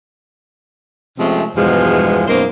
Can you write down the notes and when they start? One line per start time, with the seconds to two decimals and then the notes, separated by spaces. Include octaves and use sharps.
1.18 C3 F3 G#3 A3 C4 C#4
1.55 E2 G2 B2 F3 G#3
2.27 F#2 B2 A#3 D#4 C5